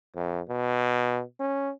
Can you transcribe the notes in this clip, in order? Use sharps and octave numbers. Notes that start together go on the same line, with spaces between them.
F2
B2
C#4